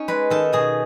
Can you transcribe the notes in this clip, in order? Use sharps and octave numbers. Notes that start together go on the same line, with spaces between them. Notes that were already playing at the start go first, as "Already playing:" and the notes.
Already playing: C#4 D#4
G#3 B4
D#3 A4
B2 G#4